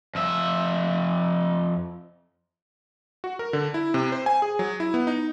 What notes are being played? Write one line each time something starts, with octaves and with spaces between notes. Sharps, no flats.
F2 E5
F#4
A#4
D3
E4
C3
C5
G#5
G#4
F#3
E4
B3
D#4